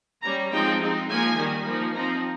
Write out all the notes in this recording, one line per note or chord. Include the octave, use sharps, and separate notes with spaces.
G3 C#4 A#5
F3 G#3 C4 D#4 G5
G#3 C4 D#4
F3 A#3 D#4 G#5
D#3 G3 A#3 D#4
F3 A#3 D#4
F3 C4 D#4 A#5